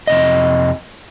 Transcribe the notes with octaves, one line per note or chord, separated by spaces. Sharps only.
F2 C3 D#5